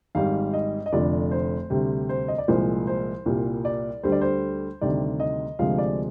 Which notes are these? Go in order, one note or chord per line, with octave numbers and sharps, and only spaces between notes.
G#1 G#2 G3 F5
D#5
D#5
F1 F2 D3 D5
C5
D2 C3 G3
C5
D#5
D5
C2 A#2 F3 G#3 C5
C5
C2 A#2 G3
D5
D2 D3 G3 C5
D5
C5
D2 C3 D#3 G3 D5
D#5
D2 C3 F3 G#3 F5
D5